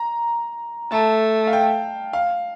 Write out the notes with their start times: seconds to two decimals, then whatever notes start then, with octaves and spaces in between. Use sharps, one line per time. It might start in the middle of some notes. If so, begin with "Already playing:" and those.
Already playing: A#5
0.91 A3 A5
1.47 F5
1.53 G5
2.13 F5